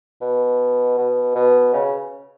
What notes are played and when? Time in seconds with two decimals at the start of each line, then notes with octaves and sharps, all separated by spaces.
0.21 B2
0.98 B2
1.35 B2
1.73 C#3